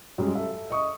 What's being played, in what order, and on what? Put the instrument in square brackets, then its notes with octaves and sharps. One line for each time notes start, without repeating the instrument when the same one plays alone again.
[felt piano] F#2 G3 G#3
A4 E5
D#5 C#6 D#6